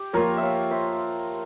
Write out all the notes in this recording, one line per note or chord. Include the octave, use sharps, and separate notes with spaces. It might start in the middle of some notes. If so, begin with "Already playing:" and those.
Already playing: G4
F3 A#3 F4 A#4 C#5
E5
C#5 F5
C5 E5